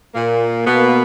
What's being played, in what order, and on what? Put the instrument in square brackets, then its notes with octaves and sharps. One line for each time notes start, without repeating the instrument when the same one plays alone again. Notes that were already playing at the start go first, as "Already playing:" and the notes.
[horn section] A#2 A#3
B2 A#3 B3